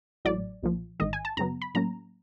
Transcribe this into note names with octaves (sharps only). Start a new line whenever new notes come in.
A1 A2 F#3 D5
B1 A#2 F3
A1 G#2 D#3 D#5
G#5
A5
F#2 C#3 F#3 B3 A#5
B5
A2 F#3 A#3 C#4 A#5